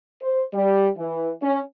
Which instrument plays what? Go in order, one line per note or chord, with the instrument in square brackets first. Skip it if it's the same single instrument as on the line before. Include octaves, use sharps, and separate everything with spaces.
[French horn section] C5
G3
E3
C#4